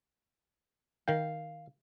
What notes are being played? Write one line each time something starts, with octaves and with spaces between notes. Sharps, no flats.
D#3 F5 G5